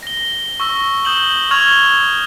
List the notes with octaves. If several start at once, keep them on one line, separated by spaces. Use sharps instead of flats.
A#6 G7
C#6 E6 A#6 G7
D#6 G6 E7 F#7 G7
C#6 F6 G#6 F7 G7